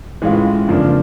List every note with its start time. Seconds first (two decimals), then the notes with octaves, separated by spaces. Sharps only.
0.22 A2 E3 G#3 C#4 F4
0.68 F2 C#3 F3 A#3 D4